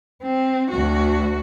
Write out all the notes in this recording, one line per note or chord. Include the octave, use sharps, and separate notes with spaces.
C4
D2 F#4